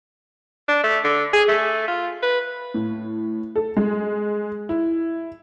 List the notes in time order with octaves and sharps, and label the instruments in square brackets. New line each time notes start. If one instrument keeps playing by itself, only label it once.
[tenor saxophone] D4
A3
D3
G#4
A3
F4
B4
[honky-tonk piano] A2
A4
G#3
E4